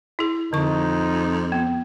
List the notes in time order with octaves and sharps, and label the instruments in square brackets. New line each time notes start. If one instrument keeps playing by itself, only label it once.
[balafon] E4 G#4
[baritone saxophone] F2 [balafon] D3 C#6 [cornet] D#4
[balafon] B3